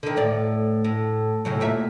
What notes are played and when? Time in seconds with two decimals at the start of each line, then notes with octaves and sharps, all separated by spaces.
0.03 D3 D#3
0.16 D2 A2 D5
0.84 A2
1.45 A2 C#3 F#3
1.60 D#2 A#2 E5